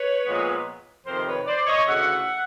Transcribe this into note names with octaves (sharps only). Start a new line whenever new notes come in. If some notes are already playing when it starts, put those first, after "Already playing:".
Already playing: B4 C#5
A#2 F3 G#3 B3
F2 C3 D#3 A#4 C5
B4 C#5
C5 D5
C#5 D#5
D2 C#3 E3 E5 F#5